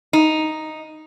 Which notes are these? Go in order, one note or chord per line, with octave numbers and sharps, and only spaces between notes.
D#4